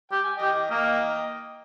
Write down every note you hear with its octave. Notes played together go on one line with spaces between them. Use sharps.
G4 G5
G#5
G4 D#5 G5
A#3 D#5 G5